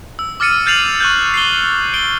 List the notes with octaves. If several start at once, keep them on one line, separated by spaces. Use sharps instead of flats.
E6
D6 F6 A6 C#7 D#7
F6 G6 A6 C7 F7 F#7
C#6 F#6 G6
C7 G7
D7 G7